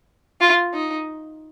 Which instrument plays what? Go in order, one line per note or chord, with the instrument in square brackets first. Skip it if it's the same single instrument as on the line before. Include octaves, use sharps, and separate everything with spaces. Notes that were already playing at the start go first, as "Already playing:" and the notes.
[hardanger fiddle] F4
D#4